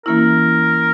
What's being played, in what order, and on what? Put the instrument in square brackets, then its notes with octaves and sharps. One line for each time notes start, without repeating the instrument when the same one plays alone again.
[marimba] E3 A#3 C#4 E4 [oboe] A#4